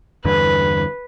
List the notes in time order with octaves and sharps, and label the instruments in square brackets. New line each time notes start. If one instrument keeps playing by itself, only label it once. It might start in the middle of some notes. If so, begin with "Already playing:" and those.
[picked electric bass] E2 G2 D3 [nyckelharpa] B4